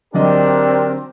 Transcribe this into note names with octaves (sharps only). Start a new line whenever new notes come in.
D3 F#3 C4 D4 G4 A#4 D#5